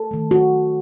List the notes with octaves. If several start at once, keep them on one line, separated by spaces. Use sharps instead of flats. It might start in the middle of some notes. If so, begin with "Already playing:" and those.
Already playing: A4
D#3 A3
F#4